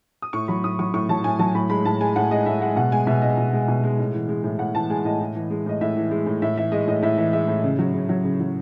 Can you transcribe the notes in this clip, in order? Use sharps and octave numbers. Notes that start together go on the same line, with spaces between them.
D#6
A2 C#6
F#3 B5
A2 D#6
F#3 C#6
A2 C#6
F#3 A5
A2 G#5
F#3 A5
A2 B5
G#3 B5
A2 A5
G#3 G#5
A2 F#5
G#3 D#5
A2 E5
G#3 F#5
B2 F#5
G#3 G#5
B2 E5
G#3 D#5
B2
G#3
B2
G#3
A2
E3
G#3
A2
A2 F#5
E3 A5
G#3 G#5
A2 D#5
A2
E3
G#3
A2 D#5
A2 E5
E3
G#3
A2
A2 E5
E3 E5
G#3 D#5
A2 D#5
A2 E5
E3 E5
G#3 E5
A2
C#3
F#3
C#3
F#3
C#3
F#3